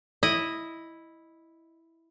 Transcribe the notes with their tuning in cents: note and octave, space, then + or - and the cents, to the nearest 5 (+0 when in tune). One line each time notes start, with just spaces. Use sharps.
E4 -5 D#5 +0